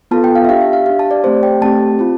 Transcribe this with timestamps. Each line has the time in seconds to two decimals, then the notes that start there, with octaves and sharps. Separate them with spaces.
0.11 B3 F4 A4 A5
0.24 G5
0.35 F5
0.44 E5
0.49 D4 G4 F5
0.61 E5
0.73 F5
0.86 D4 G4 F5
0.99 A5
1.11 D5
1.24 A3 C4 G4 C5
1.43 G5
1.61 A3 C4 G4 A5
1.99 C4 F4